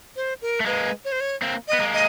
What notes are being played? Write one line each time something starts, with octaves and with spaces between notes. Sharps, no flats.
C5
A#4
A3
G#3 A#3 B4
C#5
C5
C#5
A#3 C4
D#5
B3
G#3 A#3
D#5